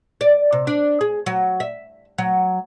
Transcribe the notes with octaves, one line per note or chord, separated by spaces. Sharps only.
D5
C3
D4
G#4
F#3
E5
F#3